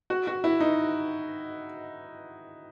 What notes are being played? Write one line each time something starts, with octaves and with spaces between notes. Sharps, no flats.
F#4
F#4
E4
D#4